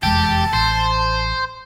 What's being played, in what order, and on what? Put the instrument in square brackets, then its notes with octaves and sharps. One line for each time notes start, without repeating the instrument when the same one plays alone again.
[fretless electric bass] F1 E2 G#3 [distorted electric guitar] G4 [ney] A5
[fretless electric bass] A1 [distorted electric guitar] C5